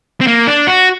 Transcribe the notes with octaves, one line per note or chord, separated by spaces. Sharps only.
C4
A#3
D4
F#4